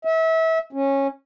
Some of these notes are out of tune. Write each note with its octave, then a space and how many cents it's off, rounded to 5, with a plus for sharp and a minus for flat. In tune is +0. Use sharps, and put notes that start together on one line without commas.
E5 -30
C#4 -15